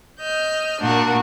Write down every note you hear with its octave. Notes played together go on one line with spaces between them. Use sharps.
D#5 F6 G6
A#2 D4 F#4 A#4